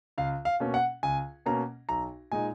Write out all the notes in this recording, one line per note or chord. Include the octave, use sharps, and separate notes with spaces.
C#2 F5
F5
B2 A#3 C#4
F#5
C#2 G#5
B2 A#3 C#4 A#5
B1 A#5
A#2 G#3 D#4 G#5